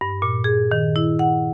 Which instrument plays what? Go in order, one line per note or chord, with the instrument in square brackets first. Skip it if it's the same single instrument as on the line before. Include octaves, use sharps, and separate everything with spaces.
[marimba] G2
A#2
G#4
D#3
E4
F#5